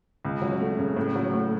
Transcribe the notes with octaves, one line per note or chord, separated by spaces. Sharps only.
C#2
F#3
A3
C#3
A2
F#3
A2